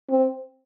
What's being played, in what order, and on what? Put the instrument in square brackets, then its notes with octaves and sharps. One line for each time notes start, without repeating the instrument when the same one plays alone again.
[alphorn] C4